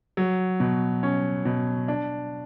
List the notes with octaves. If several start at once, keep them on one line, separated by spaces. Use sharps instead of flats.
F#3
B2
C#4
B2
D4